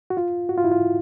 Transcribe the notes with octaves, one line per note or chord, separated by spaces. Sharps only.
F#4
F4
F#4
F4
E4
F4